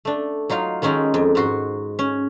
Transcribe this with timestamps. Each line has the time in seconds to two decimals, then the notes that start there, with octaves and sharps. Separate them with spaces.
0.05 A3 D4
0.50 F#3 D#4 F4 F5
0.82 D#3 G#3 C#4 D#4 A4 A#4
1.14 F2
1.35 G#2 F#4 C6
1.99 C#4